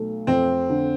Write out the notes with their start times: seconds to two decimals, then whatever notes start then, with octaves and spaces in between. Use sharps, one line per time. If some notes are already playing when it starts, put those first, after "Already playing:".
Already playing: B1 A3
0.27 F2 C4
0.69 D3